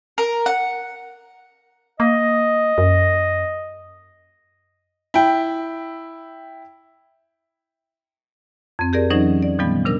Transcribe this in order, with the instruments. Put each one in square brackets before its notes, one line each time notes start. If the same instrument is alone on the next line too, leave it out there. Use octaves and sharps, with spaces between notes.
[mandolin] A#4
F#5
[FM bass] A#3 [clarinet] D#5
[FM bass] F#2
[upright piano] E4 G5
[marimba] F2 C4
G4 G#4 A#4 D5
E3 F#3 C#4 D#4 C5 D#5
D5
A#2 D#3 F3 G3 B3
C3 D4 A#4 E6